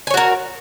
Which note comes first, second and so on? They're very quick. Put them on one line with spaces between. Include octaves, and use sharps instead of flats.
G#5 C#5 F#4 A#4